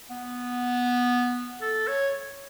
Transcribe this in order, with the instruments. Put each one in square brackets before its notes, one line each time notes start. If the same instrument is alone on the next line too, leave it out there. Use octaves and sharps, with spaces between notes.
[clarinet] B3
A4
C#5